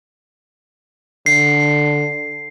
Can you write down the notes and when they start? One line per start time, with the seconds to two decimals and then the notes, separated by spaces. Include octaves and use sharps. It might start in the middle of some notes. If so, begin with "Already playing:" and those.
1.26 D3 C7